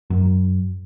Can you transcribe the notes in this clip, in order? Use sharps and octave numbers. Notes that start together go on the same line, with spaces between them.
F#2